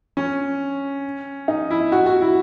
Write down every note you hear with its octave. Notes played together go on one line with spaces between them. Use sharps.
C#4
D#4
E4
F#4
F#4
E4